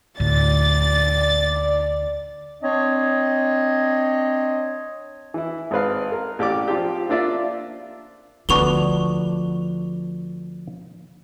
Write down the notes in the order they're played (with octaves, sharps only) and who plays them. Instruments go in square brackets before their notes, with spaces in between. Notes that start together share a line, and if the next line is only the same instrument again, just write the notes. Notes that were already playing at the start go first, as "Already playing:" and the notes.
[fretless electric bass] D2 A2 [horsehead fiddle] D5 [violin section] A6
[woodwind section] C4 D4 C#5 D#5
[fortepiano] E3 E4
G#1 C4 B4 F5
A#4
A1 G4 D5 D6
F3 C4 F4 G4
A#3 D4 F4 D5 E5
[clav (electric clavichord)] D2 B3 D4 [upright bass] F3 [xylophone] C#6 F7 G7